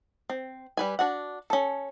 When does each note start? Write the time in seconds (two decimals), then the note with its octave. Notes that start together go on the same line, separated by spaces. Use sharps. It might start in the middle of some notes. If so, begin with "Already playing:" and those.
0.30 C4
0.77 G3 B4 G#5
0.99 D4 F#4 F#5
1.50 C#4 A4